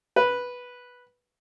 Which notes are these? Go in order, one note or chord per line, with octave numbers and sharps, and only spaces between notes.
B4